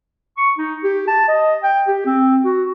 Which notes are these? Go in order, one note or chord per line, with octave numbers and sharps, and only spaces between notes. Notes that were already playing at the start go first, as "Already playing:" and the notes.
C#6
D#4
G4
A5
D#5
G5
G4
C4
F#4